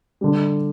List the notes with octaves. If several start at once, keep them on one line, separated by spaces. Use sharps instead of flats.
D3 G3